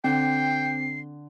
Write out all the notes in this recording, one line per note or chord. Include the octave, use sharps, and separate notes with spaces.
D3 C4 G5 C7